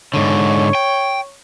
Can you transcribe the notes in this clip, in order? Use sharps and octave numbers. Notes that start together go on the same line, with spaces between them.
G#2 D3 C#5
G5